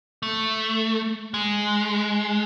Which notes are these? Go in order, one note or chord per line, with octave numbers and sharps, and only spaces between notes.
A3
G#3